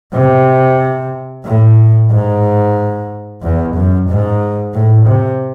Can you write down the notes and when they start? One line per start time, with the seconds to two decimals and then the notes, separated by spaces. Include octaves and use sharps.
0.13 C3
1.45 A2
2.10 G#2
3.42 E2
3.75 F#2
4.09 G#2
4.74 A2
5.07 C3